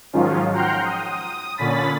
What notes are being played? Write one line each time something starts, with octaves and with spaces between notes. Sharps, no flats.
G#2 D#3 F3 F#3 C#4 F4
F#5 G5 A#5 C6 F6 G6
D#6
A#2 D3 C#4 B5 A6 B6